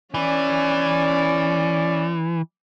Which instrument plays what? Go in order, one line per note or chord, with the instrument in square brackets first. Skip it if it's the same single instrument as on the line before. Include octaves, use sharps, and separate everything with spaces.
[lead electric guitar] E3 [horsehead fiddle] C#4 D5